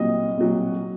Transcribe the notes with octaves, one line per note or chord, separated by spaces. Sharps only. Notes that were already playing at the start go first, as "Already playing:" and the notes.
Already playing: C2 A#2 F#3 D#5
C2 A#2 F#3